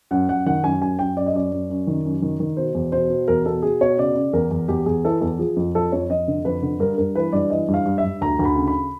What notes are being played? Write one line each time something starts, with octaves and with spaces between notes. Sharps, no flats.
F#2 F#5
F#2 F#5
D#3 F#5
F#2 G#5
F#2 G#5
F#2 G5
F#2 D5
D#5
F#2 D5
F#2
F#2
D#3
F#2
D#3
D#3
B2 C5
E2
B2 C5
B2
E2 A#4
B2 A4
B2 G#4
B2 C#5
C#3 D5
C#3
E2 A#4
E2
E2 G4
E2 G#4
E3 A4
E2 A4
F3 G#4
F2
F3 A4
F2 C#5
F2 D#5
D3
F2 B4
D3
G2 A#4
G2 A#4
E3 B4
G2 D5
E3 D#5
G2
F5
G2
E5
G2
D2 A#5
D2
B5
C#3
B5